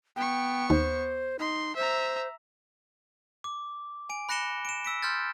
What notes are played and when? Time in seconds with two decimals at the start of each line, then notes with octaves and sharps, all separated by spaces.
0.16 B3 G5 C#6
0.70 D#2 C5
1.39 D#4 C6
1.76 C5 E5 A#5
3.44 D6
4.09 G#5 D7
4.29 B5 F#6 A#6 C#7 E7 G7
4.65 D7 E7
4.85 E6 B6 D7
5.02 C6 F6 G6 A6